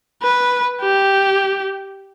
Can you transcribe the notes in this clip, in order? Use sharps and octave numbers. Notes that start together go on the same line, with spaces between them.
B4
G4